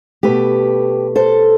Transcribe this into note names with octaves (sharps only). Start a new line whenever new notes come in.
B2 A3 G4 B4
A4 C5